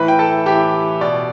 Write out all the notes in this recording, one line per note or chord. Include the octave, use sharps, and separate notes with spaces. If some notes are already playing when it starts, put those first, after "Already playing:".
Already playing: A2 E3 B4 B5
G5
A4 A5
A2 E3 G4 G5
B2 D5